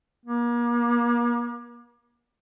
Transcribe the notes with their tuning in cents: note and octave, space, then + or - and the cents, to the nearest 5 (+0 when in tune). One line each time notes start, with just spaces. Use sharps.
A#3 +40